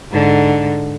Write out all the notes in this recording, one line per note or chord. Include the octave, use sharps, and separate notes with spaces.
G#2 D3